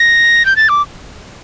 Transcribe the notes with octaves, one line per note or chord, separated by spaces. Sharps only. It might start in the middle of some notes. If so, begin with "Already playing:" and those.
Already playing: A#6
G6
A6
D6